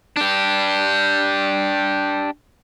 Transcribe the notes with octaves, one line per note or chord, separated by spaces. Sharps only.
D4 G4